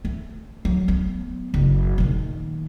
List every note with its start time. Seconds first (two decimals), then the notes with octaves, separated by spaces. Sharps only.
0.05 A3
0.65 F#3
0.88 A3 B3
1.54 F#1
1.98 A#2 D#3